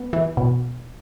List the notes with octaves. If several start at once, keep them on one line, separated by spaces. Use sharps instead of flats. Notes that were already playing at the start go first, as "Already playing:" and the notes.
Already playing: B3
E3
B2